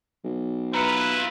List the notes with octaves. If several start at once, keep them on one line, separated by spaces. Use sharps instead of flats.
B1
E4 F4 B4 A#5 B5 C#7